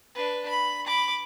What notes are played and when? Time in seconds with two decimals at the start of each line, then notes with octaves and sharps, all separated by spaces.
0.15 D4 B4
0.48 B5
0.87 B5 D6